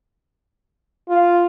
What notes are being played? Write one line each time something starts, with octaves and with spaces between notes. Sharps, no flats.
F4